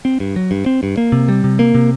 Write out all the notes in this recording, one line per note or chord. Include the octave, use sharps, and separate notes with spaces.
C4
G2
F#3
G2
C4
G2
A#3
C3
G3
C3
A#3
C3